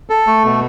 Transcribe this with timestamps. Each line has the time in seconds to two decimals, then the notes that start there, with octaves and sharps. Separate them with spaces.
0.10 A4
0.27 A3
0.44 B2